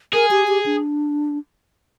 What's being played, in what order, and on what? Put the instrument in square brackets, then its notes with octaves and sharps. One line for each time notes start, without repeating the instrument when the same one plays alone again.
[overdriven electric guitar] G#4 [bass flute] A#4
[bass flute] G4
G4
D4